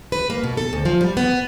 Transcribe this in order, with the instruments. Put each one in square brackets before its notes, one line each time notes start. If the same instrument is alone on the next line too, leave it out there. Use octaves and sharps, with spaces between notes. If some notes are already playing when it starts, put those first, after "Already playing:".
[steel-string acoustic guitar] B4
A#3
B2
A4
D2
F3
G3
B3